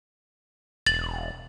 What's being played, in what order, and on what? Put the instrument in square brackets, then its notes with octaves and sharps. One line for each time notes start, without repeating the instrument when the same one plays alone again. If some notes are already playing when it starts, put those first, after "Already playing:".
[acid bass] E1 [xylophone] A6 F#7